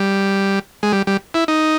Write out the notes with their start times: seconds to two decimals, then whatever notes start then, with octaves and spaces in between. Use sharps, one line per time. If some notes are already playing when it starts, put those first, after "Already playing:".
Already playing: G3
0.83 G#3
0.93 G3
1.07 G3
1.34 E4
1.48 D#4